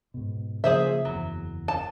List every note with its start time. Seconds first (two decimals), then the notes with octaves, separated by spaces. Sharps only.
0.14 G#2 B2
0.64 C#3 F3 A#3 G#4 C5 E5
1.05 F#1 E2 F#3
1.68 A5